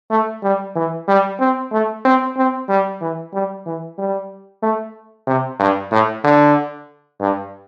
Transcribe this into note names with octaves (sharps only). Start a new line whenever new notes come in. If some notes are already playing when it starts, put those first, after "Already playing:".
A3
G3
E3
G3
C4
A3
C4
C4
G3
E3
G3
E3
G3
A3
C3
G2
A2
D3
G2